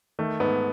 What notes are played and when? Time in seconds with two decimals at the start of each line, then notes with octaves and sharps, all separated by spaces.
0.19 D#3 A3
0.40 G#2 B3